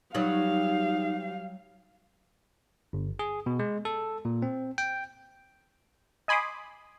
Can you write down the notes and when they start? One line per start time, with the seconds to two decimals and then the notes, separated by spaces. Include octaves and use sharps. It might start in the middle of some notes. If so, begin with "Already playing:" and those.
0.15 F#3 G3 D#4 G4 F5
2.93 G1
3.19 G#4
3.46 B2
3.59 G#3
3.85 A4
4.25 A#2
4.42 C4
4.78 G5
6.28 D#5 G#5 B5 C6 D6 D#6